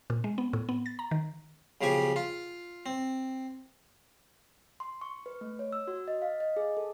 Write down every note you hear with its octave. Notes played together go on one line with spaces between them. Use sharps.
A#2
G#3
B3
A2
B3
A6
A#5
D#3
B1 C#3 F3 G4 G#5
F4
C4
C6
C#6
B4
A3
C#5
E6
F#4
D#5
F5
D#5
G#4
A4